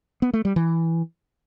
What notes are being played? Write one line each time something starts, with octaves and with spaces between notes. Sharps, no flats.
B3
A3
G3
E3